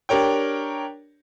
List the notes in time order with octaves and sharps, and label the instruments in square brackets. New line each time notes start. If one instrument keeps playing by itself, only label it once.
[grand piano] D4 G4 A#4 C#5 G5